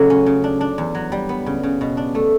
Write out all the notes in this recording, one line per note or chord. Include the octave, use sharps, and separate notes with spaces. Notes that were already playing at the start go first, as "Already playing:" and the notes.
Already playing: C#3 F#3 A3
C#4
C#3
D4
D4
E2
F#3
G3
B3
C#3
C#3
B2
D4
A3